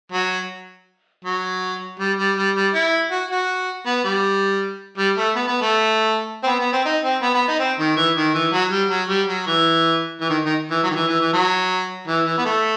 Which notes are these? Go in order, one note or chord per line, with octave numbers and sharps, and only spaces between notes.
F#3
F#3
G3
G3
G3
G3
E4
F#4
F#4
B3
G3
G3
A3
B3
B3
A3
C4
B3
B3
C4
D#4
C4
B3
B3
D#4
C4
D#3
E3
D#3
E3
F#3
G3
F#3
G3
F#3
E3
E3
D#3
D#3
E3
F#3
D#3
E3
E3
E3
F#3
E3
E3
B3
A3